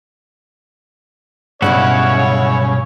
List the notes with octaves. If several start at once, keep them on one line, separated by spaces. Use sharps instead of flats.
B1 E2 G2 C#3 E4 C#5 F#5